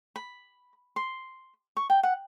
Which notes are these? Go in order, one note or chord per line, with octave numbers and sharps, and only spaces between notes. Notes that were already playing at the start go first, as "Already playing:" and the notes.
B5
C6
C#6
G5
F#5